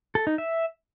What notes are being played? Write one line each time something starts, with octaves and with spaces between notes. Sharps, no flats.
A4
D#4
E5